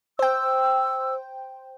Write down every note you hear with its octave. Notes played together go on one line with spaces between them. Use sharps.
C5 G5 E6